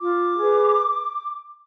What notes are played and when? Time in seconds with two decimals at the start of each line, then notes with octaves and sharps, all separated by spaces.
0.01 F4 D6
0.37 G#4 B4